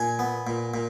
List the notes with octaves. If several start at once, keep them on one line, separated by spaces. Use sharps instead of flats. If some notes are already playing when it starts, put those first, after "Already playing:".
Already playing: A#2 G#5
B3
A#2
A#2